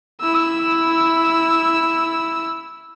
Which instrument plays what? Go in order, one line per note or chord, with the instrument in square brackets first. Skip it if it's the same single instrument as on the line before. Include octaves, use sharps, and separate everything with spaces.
[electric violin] E4 E6